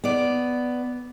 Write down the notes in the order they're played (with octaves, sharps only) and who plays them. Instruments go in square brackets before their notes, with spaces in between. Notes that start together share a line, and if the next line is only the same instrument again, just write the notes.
[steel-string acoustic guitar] B3 D5